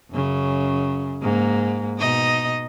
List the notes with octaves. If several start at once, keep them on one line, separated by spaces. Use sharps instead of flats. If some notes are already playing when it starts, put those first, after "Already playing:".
F#2 C#3
G#2 A#3
B2 D#4 D#5